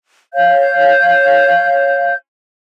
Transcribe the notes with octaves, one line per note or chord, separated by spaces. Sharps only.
C#5 F5 G6